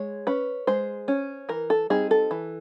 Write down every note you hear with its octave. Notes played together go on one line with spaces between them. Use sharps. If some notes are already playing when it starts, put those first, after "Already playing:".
Already playing: G#3 C#5
C#4 B4
G#3 C5
C#4
E3 A#4
A4
G3 C4 D#4 G#4
A4
E3